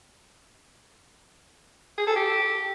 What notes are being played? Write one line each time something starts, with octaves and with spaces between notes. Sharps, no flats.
G#4
A4
G4